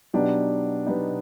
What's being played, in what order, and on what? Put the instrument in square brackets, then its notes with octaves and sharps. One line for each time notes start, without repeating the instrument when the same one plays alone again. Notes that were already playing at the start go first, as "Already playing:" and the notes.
[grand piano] B2 F#3 B3 D#4 G4 [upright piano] D4
[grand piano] B2 F#3 B3 D#4 G4